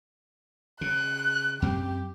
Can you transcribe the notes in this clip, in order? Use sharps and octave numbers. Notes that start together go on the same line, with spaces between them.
C#3 F#6
F#2 C4 G4